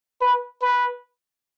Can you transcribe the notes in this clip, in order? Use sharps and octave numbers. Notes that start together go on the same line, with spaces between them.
B4
B4